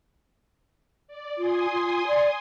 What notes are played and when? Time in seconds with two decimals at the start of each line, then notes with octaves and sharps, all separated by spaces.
1.07 D5
1.38 F4 G#5 C6 D#6
1.72 F4
2.08 D5